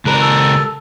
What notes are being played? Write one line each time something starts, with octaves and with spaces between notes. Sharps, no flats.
C#2 D4 A#4 B4
A4